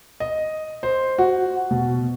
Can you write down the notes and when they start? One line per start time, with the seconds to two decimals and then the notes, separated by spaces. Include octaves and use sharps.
0.20 D#5
0.83 C5
1.18 F#4
1.71 B2